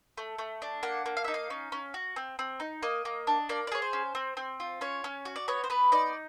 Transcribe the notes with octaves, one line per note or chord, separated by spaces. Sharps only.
A3
A3
D4
A#3 F#5
A#3
F5
D#4 E5
F5
C#4
C#4
F#4
C4
C4
D#4
A#3 D#5
A#3
D4
A#3 D5
D5
G#4 C#5
C5
C#4
C4
C4
F4
C#4 C#5
C#4
F#4
D5
B3 C#5
C5
B3 B4
D#4 D5